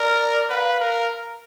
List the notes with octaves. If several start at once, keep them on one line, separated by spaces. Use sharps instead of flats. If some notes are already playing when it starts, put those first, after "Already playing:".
Already playing: A#4 D5
B4 F5 F#5
A#4